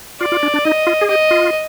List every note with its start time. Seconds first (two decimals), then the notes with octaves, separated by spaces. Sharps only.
0.21 F4 D5
0.32 F4
0.43 D4
0.54 D4
0.64 D#4 D#5
0.87 F4
1.01 G#4
1.09 G4 D#5
1.31 F4